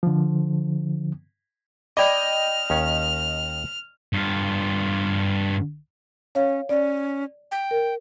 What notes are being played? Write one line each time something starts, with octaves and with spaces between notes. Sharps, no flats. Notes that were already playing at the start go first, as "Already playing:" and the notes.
D3 F3
D5 D#5 G5 B5 D6 F6
D#2 D#3 C#4
G2 F4
C#4 C#5 F5
C#4 D5
G5
A#4